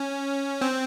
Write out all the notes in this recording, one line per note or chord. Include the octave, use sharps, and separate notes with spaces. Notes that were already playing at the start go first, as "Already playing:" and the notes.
Already playing: C#4
C4